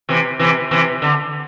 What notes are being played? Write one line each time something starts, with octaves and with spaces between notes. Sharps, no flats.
C3 E3
C3 E3
C3 E3
D3